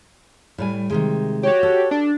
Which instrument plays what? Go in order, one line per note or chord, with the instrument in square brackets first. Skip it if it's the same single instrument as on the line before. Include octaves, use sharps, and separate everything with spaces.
[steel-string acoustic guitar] A2 G3 G#5
C3 D#3 G#3
[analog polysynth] F#4 G4 [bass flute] C#5
[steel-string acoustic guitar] A4
[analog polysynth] D4